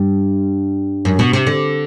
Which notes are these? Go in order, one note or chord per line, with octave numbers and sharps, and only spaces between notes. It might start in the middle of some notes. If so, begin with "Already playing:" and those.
Already playing: G2
F#2
B2
C3
D3